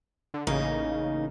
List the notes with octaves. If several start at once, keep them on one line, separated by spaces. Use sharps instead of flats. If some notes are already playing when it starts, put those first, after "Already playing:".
D3
A1 C#3 A#3 D#4